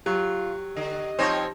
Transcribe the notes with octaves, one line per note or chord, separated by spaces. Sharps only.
F#3 F4 G4
D3 D#5
F3 C4 D#4 C5 C#5